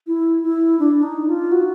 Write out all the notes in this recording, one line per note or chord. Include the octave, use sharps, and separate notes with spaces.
E4
E4
D4
D#4
F4
F#4